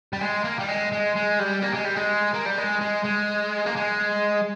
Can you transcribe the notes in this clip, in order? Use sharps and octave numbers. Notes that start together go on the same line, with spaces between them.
G3
G#3
A#3
G3
G#3
G#3
G#3
G3
A#3
G#3
G3
G#3
A#3
G3
G#3
G#3
G#3
A#3
G#3